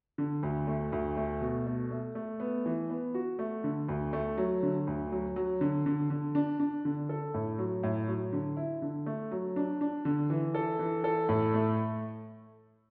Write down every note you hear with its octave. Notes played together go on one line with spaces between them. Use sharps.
D3
D2
A3
D2
A3
B2
A3
A3
A3
B3
E3
B3
F#4
A3
D3
D2
A3
F#3
D3
D2
F#3
F#3
D3
D3
D3
D4
D4
D3
A4
A2
F#3
A2
F#3
D3
E4
D3
A3
F#3
D4
D4
D3
E3
A4
E3
A4
A2
A3